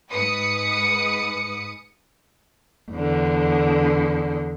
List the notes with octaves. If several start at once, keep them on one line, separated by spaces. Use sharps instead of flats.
G#2 B4 D#6 C#7
E2 D3